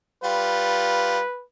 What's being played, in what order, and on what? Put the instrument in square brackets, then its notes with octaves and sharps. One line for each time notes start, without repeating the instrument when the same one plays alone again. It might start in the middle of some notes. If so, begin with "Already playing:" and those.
[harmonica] G3 F4 [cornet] B4